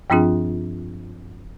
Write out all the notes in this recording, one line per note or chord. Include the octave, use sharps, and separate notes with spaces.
G2 F3 C4 D4 F4 G#4